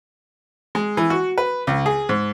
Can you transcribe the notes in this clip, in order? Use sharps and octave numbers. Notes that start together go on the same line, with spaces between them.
G#3
E3
F#4
B4
C#2
G#4
G#2